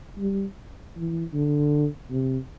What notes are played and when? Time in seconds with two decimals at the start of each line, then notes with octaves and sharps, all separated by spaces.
0.19 G3
0.96 E3
1.34 D3
2.11 C3